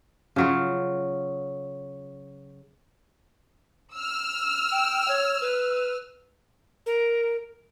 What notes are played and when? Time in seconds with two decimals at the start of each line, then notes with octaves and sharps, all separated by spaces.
0.36 C#3 F#3 F4
3.95 E6 F6
4.71 G5
5.08 C#5
5.41 B4
6.86 A#4